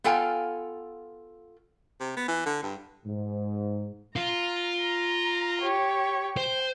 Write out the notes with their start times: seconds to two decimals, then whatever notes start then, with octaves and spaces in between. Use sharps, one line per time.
0.04 B3 F4 A4 F5 G5 G#5
2.01 C3
2.17 B3
2.28 E3
2.46 D3
2.63 G2
3.05 G#2
4.16 F4 A#5
4.81 A#5
5.61 G4 C#5
6.37 C5 G5